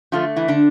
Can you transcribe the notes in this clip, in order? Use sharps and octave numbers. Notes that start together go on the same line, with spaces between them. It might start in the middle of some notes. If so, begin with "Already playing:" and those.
D3 F3 A3 F4
E3 E4
D3 D4